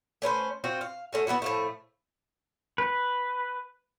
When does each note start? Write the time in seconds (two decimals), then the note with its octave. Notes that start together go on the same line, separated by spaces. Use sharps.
0.22 A3 C#4 B4 C5
0.64 C4 F4 F#4
0.81 F5
1.13 A3 C#4 F#4
1.27 B3 D#4 E4 F#4
1.42 A2 F3 A3
2.78 B4